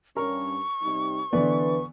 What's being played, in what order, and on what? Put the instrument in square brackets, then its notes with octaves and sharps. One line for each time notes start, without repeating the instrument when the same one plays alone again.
[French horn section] G2 C#4 [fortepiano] A#4 [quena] C#6
[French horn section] C3 G3 D#4
[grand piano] D3 E3 D5 [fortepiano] B3 [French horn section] B4